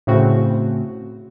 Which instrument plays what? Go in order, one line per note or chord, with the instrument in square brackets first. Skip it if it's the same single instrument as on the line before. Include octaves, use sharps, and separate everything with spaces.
[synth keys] A2 C#3 C4 F#4